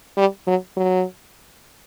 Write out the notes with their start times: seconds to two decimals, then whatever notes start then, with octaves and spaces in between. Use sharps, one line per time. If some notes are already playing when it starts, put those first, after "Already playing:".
0.17 G3
0.46 F#3
0.77 F#3